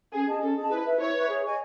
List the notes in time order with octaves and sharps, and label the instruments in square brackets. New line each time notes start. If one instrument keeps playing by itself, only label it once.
[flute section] C#4 [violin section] G#4
[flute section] G#4 D#5 A5
[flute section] C#4 [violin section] A4
[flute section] G#4 D#5 A5
[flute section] E4 [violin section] B4
[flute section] B4 E5
[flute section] E4 [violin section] C#5
[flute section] B4 E5
G#4
D#5 G#5 C#6